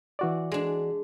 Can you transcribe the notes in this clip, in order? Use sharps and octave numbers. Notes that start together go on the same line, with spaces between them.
E3 F#4 D5
G#3 D4